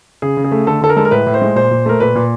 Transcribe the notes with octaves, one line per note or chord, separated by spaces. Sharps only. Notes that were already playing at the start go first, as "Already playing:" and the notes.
C#3 G#4
C#3
G#4
A3
D3 A4
D3 A4
A#4
G#3 A4
A#4
A2 B4
A2
C5
G#3
A#2 C5
A#2
A3 A#4
A#2 B4
A#2